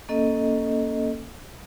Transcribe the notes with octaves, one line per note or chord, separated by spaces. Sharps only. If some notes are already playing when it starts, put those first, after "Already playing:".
A#3 C#4 A4 D#5